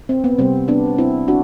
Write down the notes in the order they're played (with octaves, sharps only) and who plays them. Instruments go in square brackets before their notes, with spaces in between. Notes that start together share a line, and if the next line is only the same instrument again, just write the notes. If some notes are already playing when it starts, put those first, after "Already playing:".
[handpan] C4
B3
C3 G3 B3 C4
B3 D4
C4 E4
D4 F#4